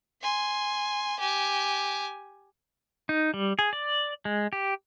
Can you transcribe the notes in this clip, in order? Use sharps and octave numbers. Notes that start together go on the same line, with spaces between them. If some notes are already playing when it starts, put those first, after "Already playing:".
G#5 C6
G4 G#5
D#4
G3
G#4
D5
G#3
G4